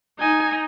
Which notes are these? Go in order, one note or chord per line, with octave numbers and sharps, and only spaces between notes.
D#4 G#5